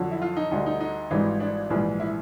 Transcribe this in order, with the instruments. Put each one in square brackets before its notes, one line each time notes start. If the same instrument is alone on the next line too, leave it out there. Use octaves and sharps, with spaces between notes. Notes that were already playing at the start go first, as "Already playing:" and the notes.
Already playing: [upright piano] F2 D3 F#3
E4
F4
D#4
D2 D3 G3 D#4
D#4
D#4
G#1 G#2 E3 G3
D4
A#1 G#2 E3 G3
E4